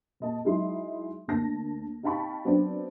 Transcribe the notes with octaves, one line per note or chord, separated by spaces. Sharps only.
A#2 D#5 A5
F#3 G#3 D#4 E4 C6
D2 A#3 A5 A#6
D#4 F5 G5 A5 B5 C#6
F#3 B3 C4 D4